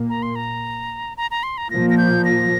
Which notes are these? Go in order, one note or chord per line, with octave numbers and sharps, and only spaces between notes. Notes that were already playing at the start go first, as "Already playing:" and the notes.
Already playing: A#2 A#3
A#5
C6
A#5
A#5
A#5
C6
A#5
A#2 F3 A#3 A#6
A#6
G6
A#6